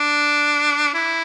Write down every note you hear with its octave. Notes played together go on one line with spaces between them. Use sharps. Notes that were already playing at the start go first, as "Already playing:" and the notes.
Already playing: D4
E4